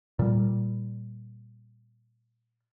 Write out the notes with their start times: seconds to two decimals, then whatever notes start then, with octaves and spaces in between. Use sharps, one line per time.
0.19 A#2 G3